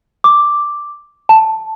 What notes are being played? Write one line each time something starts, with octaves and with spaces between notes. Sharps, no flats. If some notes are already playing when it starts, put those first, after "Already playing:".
D6
A5